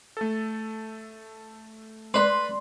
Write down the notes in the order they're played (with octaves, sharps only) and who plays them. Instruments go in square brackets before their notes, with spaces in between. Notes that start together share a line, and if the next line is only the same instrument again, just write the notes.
[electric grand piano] A3 A4
[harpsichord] B4 [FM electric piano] D5 C6